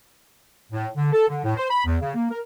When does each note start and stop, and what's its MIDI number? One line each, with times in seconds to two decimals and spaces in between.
0.72 0.88 45
0.96 1.11 50
1.13 1.28 69
1.29 1.42 50
1.45 1.53 45
1.57 1.69 72
1.70 1.83 83
1.86 1.97 40
2.02 2.14 49
2.15 2.30 58
2.31 2.39 70